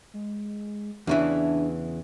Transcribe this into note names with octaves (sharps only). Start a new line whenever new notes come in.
G#3
E2 C#3 E3 D4